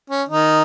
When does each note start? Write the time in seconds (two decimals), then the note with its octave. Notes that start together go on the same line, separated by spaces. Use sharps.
0.10 C#4
0.29 D#3 D#4